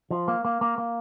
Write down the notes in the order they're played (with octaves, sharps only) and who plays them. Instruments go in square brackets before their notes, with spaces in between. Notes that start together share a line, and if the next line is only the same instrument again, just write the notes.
[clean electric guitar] F3
A#3
A#3
A#3
A#3